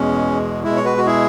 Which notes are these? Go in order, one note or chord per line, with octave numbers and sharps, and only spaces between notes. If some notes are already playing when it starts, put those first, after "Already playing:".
Already playing: E2 B2 G#3 C#4
B2 G#3 E4
C#5
F#4 B4
F#4
E4 G#4